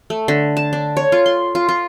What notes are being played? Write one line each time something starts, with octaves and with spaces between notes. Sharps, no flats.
A3
D3
A5
D4
C#5
F4
C6
F4
F4